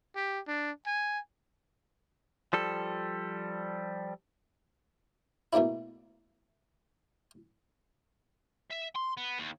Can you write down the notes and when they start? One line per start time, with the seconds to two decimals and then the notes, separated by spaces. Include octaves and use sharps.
0.16 G4
0.48 D4
0.87 G#5
2.53 F3 G3 A4
5.53 B2 A3 A#3 D4 E4
8.70 E5
8.95 C6
9.17 B3
9.39 D#2